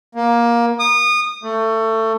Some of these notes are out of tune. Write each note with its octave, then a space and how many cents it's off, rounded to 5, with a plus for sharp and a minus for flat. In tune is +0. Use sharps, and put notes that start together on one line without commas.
A#3 +15
D#6 -25
A3 +20